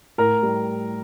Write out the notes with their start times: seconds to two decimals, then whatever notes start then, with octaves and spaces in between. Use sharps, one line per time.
0.18 A2 A#4 A#5
0.43 G3